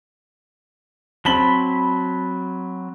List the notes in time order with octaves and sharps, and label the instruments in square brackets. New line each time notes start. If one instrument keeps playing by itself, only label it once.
[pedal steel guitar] F#3 A5 B5 [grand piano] C4 F#7 G7